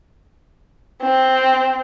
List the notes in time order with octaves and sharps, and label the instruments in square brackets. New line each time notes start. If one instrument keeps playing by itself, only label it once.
[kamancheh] C4